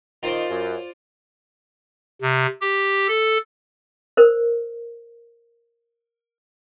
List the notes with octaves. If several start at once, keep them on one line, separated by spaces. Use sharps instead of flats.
D#3 F4 C5 D5
F#2
C3
G4
A4
A#4 C5